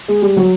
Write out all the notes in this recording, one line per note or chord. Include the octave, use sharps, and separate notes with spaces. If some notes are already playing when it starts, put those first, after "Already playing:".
G#3
G3
F#3